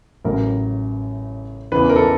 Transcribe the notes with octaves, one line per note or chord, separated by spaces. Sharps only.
A1 A2 F#3 A#4
E2 C#3 E3 B4
A#4
A4